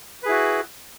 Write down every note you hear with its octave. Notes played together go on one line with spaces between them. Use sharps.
E4 F#4 G#4 B4